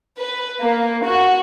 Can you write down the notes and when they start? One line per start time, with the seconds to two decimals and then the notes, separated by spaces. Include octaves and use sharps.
0.19 B4
0.60 A#3
1.07 F#4